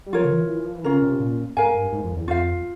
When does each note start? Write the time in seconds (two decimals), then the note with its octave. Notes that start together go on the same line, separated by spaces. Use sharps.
0.06 G3
0.13 F3 F4 A#4 C#5
0.25 C#3
0.31 E3
0.49 E3
0.65 F3
0.75 E3
0.84 C#3 C#4 F4 A#4
1.02 C3
1.20 A#2
1.57 G#2 A#4 F5 G#5
1.75 G2
1.93 G#2
2.04 F2
2.17 E2
2.28 F2 F4 C5 F5